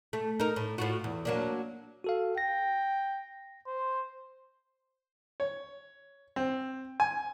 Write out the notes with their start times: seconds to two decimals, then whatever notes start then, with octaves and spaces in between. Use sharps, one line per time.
0.13 A3
0.40 D#4 A#4
0.56 A2
0.78 A2 F4 F#4
1.04 E2
1.25 F#3 A#3 D4
2.04 F#4 A4 F5
2.38 G5 A#6
3.67 C5
5.40 C#5
6.36 C4
7.00 G#5